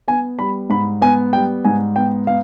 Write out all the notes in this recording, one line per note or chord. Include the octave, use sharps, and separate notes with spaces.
B3 G#5
G3 B5
G#2 B5
B3 G#5
G3 G5
G#2 G#5
B3 G5
B3 F5